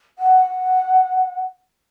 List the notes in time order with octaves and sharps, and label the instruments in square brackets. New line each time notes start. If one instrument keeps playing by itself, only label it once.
[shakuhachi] F#5